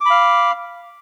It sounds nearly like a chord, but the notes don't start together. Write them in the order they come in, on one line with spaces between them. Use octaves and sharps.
D6 B5 F5